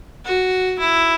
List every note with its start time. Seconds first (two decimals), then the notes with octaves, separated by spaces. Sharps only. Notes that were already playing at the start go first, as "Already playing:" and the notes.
0.25 F#4
0.79 E4